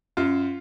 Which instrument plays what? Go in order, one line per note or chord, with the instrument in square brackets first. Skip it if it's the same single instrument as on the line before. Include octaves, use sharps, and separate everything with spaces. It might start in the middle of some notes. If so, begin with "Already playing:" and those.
[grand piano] F#2 F4